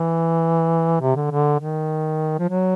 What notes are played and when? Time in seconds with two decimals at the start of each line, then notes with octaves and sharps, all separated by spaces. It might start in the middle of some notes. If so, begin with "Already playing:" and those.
Already playing: E3
1.01 C3
1.16 D3
1.31 D3
1.60 D#3
2.39 F3
2.49 F#3